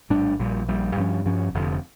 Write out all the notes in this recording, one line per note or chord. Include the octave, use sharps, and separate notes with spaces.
A#1 A2 G3 D4
A#1 A#2 G3
A#1 A#2 G3
G2 F3 C#4
G2 F3 C#4
F1 F2 D3 F3